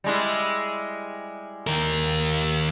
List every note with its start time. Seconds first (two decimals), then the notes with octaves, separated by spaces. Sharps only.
0.04 G3 G#3 E4
1.67 D#2 A#4